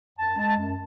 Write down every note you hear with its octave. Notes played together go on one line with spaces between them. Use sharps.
F#2 A5
G#3 A5
F#2